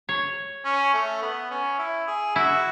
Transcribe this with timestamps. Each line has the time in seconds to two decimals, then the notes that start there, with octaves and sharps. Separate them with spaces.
0.09 C#5
0.65 C#4
0.94 A3
1.22 B3
1.51 C#4
1.79 E4
2.07 G#4
2.35 E4 F#4